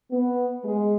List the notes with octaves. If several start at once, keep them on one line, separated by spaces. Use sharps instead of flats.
B3
G#3